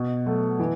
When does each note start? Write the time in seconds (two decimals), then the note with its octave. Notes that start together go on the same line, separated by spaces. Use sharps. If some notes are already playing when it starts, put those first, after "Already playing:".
Already playing: B2
0.26 F#3 A3
0.59 E3